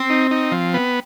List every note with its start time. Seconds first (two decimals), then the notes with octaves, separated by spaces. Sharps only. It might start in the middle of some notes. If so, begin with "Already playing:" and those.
Already playing: C4
0.10 D#4
0.31 D#4
0.52 F3
0.74 B3